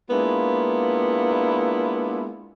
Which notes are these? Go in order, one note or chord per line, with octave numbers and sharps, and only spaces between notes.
G#3 A#3 B3 D4 E4 F4